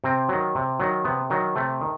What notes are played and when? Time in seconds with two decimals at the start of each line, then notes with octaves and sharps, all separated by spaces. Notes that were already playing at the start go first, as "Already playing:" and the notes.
0.04 C3 C4
0.29 D#3 F#3
0.55 C3
0.79 D#3 F#3
1.05 C3 B3
1.30 D#3 F#3
1.56 C3 A3
1.81 D#3